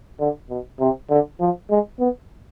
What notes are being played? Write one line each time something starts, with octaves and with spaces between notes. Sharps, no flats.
D3
B2
C3
D3
F3
G#3
B3